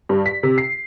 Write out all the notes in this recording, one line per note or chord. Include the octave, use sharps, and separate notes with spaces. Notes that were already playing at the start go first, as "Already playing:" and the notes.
G2
B6
C3
C7